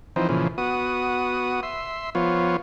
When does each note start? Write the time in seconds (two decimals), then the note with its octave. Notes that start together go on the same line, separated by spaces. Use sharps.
0.16 E3 F3 C4 D#4
0.29 A#2 C#3 E3 F3
0.58 B3 F#4 D#6
1.63 E5 C6
2.15 F3 B3 F4 C#5